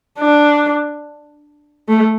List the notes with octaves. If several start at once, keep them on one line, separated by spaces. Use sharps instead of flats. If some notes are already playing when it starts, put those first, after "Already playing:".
D4
A3